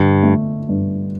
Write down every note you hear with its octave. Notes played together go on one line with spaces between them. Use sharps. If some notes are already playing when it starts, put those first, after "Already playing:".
Already playing: G2 D3
A3
G2